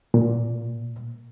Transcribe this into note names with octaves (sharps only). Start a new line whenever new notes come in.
A#2